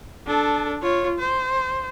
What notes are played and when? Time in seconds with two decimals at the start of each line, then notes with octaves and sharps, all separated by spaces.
0.26 D4 A4
0.82 F4 C#5
1.19 C5